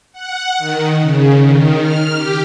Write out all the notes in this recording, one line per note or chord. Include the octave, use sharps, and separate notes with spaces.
F#5
D#3
C#3
D#3
F6
G4